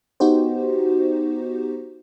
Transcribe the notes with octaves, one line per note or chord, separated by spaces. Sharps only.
B3 D#4 F#4 G4 C5